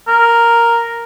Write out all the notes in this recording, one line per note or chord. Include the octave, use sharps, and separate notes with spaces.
A#4